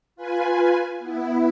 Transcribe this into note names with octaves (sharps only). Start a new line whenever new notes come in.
F4 B4 G#5
B3 E4